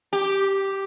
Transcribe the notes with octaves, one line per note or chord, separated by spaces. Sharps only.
G4